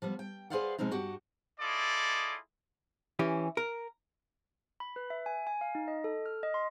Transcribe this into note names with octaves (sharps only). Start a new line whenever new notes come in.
F3 G3 B3
G5
G#4 B4 C5 D5 F5 F#5
B2 F3 G#3 C4 D#4
G2 F#4 G4 F#5
E4 F4 G#4 A4 D5 D#5
E3 C#4 G4
A#4
B5
B4
E5
G#5
G#5
F5
D#4
D#5
A4
F6
D#5
C6